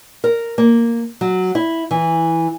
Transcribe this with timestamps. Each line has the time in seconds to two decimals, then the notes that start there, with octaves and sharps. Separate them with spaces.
0.24 A#4
0.58 A#3
1.21 F#3
1.55 E4
1.91 E3